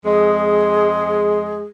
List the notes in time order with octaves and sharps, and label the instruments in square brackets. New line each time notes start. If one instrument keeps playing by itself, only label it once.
[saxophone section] F2 G#3 [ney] G#4